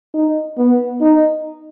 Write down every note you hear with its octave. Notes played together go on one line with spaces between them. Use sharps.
D#4
B3
D#4